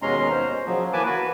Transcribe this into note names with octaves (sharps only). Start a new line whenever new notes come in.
D#2 B2 G#3 C#4 A#5 C6
C5
A#2
C#3 F3 F#3
E3 A#3 B4 G#5 A5 D6
F#4 B4